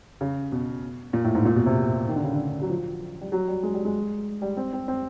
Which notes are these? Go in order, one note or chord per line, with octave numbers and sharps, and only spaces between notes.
C#3
B2
A#2
A2
G#2
A#2
B2
C3
D#3
D3
C#3
D3
F#3
F3
G3
F#3
G3
G#3
G3
G#3
G3
C4
C4
C4